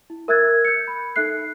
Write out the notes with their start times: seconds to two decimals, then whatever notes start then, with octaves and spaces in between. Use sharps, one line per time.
0.10 E4
0.28 A#4 E5 E6 F#6 G#6 A6
0.65 G6 C#7
0.88 B5
1.16 D#4 A4 E5 F#6 C7